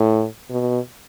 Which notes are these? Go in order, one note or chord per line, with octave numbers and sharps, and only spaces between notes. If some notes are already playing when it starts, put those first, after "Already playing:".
Already playing: A2
B2